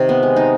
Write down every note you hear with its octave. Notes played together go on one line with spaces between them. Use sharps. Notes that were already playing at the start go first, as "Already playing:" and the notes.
Already playing: C3 D#3
B3
G#3
D#4